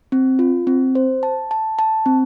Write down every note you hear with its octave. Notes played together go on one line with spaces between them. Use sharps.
C4
F4
C4
C5
A5
A5
A5
C4